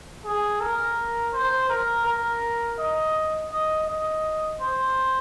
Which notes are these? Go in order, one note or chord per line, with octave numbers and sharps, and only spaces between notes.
G#4
A#4
C5
A#4
A#4
D#5
D#5
D#5
C5